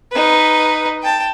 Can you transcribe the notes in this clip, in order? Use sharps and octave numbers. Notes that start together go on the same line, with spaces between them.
D#4 B4
G5 A5